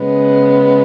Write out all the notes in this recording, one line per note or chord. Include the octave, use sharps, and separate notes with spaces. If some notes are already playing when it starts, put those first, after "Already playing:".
Already playing: C#3 G#3 B3